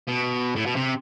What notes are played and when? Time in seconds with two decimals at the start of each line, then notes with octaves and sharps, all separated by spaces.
0.08 B2
0.56 A2
0.66 B2
0.76 C3